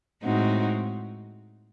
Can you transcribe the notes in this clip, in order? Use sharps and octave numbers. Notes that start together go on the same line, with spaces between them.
A2 G#3 C4 D#4 F#4